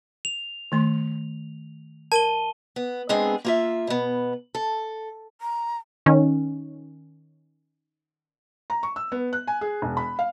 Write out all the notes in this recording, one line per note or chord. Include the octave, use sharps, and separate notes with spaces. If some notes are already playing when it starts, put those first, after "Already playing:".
F7
D#3 A3 C6
A#4 A5 D#7 G7
B3
G#3 B3 C4 D4 G#4
A#3 F4 E5
B2 B3
A4
A#5
D#3 C#4
A#5
C#6
E6
B3
F#6
G#5
G#4
E1
B5
F5